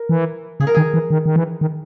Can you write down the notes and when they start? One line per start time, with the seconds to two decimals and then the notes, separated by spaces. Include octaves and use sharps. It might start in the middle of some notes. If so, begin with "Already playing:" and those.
Already playing: A#4
0.09 E3
0.60 C#3 G#4
0.67 A#4
0.75 D#3 G#4
0.94 E3
1.10 D#3
1.26 D#3
1.36 E3
1.61 D#3